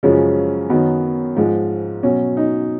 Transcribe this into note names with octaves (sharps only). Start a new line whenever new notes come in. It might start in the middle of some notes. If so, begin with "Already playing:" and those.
F#2 C#3 F3 G#3 C#4
F#2 D#3 F#3 B3
G#2 F3 G#3
B2 F#3 C#4
D#4